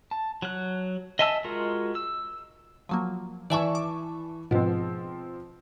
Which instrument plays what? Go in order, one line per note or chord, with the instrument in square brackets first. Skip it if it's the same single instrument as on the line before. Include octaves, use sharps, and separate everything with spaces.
[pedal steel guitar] A5
F#3 F#6
D#5 E5 G#5 A5 E6
G#3 F4 F#4 A#4
E6
[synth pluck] F3 F#3 A#3
[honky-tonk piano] E3 A5 C#6 [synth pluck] D5 E5 G#5
[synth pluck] D6
[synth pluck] G#2 B2 [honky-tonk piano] F3 C4